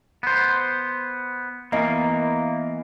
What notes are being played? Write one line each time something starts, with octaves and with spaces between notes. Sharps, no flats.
B3 C5
E3 A#3 B3 D#5 C7